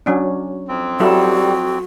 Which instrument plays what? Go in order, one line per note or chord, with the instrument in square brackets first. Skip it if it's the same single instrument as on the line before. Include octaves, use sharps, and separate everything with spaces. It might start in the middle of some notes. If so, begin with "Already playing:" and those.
[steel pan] F#3 C#4 D4
[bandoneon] F2 C4
[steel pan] F#3 E4 A4 [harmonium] G3 [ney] F#4